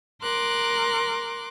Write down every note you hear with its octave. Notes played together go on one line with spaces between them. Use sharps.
A#4 C6 D6 F#6